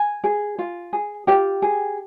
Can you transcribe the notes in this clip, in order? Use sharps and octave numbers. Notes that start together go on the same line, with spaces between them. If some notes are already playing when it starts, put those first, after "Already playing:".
Already playing: G#5
G#4
F4
G#4
F4 G4 G5
G#4